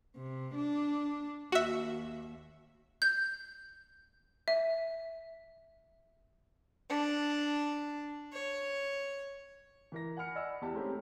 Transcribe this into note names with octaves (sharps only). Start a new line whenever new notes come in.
C3
D4
D#2 F#4 E5
G6
E5
D4
C#5
E3 A#4 A#6
F#5 G#5 B5 F6 C#7
D5 D#5 F#5 G#5 B5 E6
E2 E4 G4 A5
G#3 A3 C4 C#4 D#4 G4